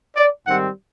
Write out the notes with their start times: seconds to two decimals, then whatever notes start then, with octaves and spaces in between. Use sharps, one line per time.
0.16 D5
0.47 G#2 D#3 G3 C4 F#5